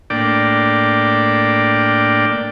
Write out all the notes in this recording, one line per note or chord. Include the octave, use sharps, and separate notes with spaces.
A2 A#3 D4 D5 G5